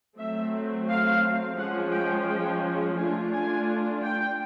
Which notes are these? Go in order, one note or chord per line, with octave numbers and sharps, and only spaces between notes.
F#3 A3 C4 E5
F5
F3 G#3 C#4 F#5
G5
G5
A3 D4 F4 G#5
G#5
G5